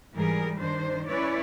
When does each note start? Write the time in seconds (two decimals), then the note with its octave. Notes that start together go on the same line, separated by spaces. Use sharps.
0.13 G#2 E3 G3 G#4 A#4
0.57 G2 D#3 D4 C5
1.07 C#4 E4 B4 C#5 D5